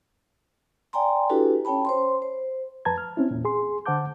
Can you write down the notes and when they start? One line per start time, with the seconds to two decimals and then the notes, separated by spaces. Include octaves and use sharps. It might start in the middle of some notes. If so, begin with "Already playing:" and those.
0.93 D5 G5 G#5 A#5 C6
1.29 D4 E4 F#4 G4 A4 B4
1.65 C#4 C#5 G5 A5 B5
1.85 C5 C#5 C6
2.22 C5
2.85 F2 B4 A5 A#5 G#6
2.98 F6
3.17 C4 C#4 E4
3.31 E2 A#2
3.45 G#4 C6
3.86 D3 C5 F#5 A5 D6 G6